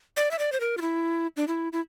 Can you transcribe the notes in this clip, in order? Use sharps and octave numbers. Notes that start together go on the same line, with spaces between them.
D5
E5
D5
C5
A#4
F4
E4
D4
E4
E4